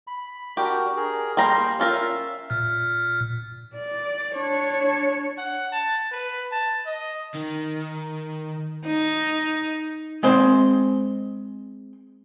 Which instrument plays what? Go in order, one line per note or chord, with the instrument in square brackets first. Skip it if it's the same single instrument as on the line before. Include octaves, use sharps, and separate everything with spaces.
[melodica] B5
[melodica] D4 F#4 A#4 [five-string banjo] G4
[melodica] G#4 A#4
[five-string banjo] G3 A#3 A#5 [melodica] G5 C6
[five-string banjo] C#4 F4 A#4 [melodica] E5
[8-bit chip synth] A#2 F6
[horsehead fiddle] D5
D4 C#5
[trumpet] F#5
A5
B4
A5
D#5
[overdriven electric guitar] D#3
[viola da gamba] D#4
[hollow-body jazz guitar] G#3 C4 C6